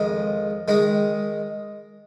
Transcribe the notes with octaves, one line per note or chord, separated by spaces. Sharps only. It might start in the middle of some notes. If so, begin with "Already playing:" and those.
Already playing: F2 D#3 G#3
D#3 G#3 D#4